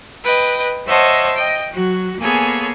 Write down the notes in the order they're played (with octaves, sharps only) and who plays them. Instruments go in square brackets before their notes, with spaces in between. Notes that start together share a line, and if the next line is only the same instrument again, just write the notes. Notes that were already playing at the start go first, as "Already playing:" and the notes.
[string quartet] B4 D#5 G5
C5 C#5 D#5 E5 F#5 A5
D#5 G5
F#3 F#4
A#3 B3 G#4 A4 C#5 G#5